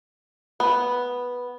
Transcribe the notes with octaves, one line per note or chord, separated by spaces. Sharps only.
B3